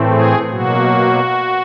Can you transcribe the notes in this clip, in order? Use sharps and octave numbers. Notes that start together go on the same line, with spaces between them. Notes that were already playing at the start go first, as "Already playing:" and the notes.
Already playing: A2 E3 A3 C4
G#4
B2 F#3 A#3 F#4